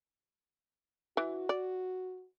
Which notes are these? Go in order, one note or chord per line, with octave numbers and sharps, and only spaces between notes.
E3 F#4
D5